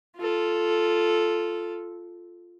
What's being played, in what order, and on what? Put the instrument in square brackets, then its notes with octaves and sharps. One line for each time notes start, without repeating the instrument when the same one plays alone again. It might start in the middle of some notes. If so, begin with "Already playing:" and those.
[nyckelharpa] F4 A4